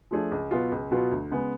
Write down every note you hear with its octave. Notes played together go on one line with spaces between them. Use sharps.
F3 A3 D4 G#4
C#2
B2 F#3 B3 F4
C#2
B2 F#3 B3 F4
D2
C#3 G#3 B3